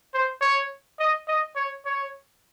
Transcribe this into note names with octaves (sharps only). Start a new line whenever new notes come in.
C5
C#5
D#5
D#5
C#5
C#5